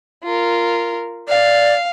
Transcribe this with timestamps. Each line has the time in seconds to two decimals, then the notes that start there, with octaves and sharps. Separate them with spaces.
0.24 F4 A#4
1.28 D5 F5